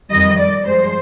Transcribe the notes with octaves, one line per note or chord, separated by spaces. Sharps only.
F2 D#3 G3 D#5
D5
G2 F3 G#3 C5